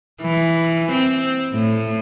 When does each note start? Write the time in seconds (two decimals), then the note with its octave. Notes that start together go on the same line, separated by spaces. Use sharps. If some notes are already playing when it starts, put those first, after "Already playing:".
0.21 E3
0.92 C4
1.53 A2